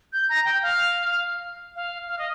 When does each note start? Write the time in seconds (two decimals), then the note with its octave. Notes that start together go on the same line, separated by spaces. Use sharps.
0.13 G6
0.29 A#5
0.45 G5
0.62 F5
1.76 F5
2.08 F5
2.19 D#5